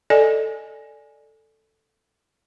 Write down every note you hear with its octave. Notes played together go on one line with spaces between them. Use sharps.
A4 D5 D#5 G#5